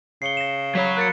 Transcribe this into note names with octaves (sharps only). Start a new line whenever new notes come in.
C#3 C7 C#7 G7
A#6 E7
F#3 C#5 B5 B6
A#3 F#6 A6 C#7